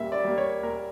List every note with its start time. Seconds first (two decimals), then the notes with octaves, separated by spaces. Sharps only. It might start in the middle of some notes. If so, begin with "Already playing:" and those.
Already playing: A#2 G3 A#3 E5
0.12 D5
0.24 G3 A#3
0.38 C#5
0.63 A#2 A#4